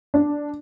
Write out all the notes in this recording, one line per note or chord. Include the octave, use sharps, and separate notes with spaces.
D4